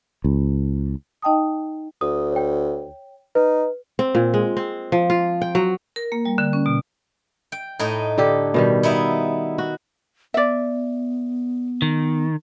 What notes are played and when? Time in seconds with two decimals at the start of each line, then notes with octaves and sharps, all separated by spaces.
0.24 C#2
1.22 D#4 D#5 G5 A5 D#6
2.01 D2 D#6
2.32 C#5 G5
3.35 D#4 B4
3.99 C4
4.15 A#2
4.34 G#3
4.57 C4
4.92 F3
5.10 F4
5.42 G5
5.55 F#3
5.96 A#4
6.12 A#3
6.25 G3
6.38 D3
6.53 C#4
6.66 B2
7.52 G5
7.79 A2 D#4 D#5
8.18 D3 G4 A4
8.54 B2 D#3 G3
8.83 B3 D#4 E4
9.58 F#4
10.34 B3 D5 E5
11.82 D#3